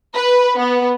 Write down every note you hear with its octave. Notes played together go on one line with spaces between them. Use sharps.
B4
B3